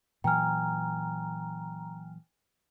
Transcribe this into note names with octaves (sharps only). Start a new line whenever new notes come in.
A#2 E3 F#3 G5 G#5 A#5 F6